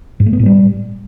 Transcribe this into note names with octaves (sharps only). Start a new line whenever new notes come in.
G#2
A3
B3
A2
G3